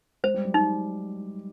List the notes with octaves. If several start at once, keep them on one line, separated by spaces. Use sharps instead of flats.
G#3 C5
G3
F#3
G3 D#4